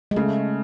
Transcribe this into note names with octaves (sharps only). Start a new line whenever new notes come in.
G#3
C#3 A3